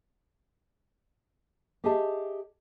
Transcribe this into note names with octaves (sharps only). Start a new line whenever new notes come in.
G4 G#4 C#5 D#5 E5 A5